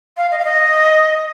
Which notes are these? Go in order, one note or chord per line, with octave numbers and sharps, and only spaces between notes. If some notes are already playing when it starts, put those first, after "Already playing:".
F5
D#5
F5
D#5